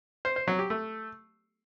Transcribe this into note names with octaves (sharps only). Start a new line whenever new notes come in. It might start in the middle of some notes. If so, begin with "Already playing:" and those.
C5
C5
F#3
G4
A3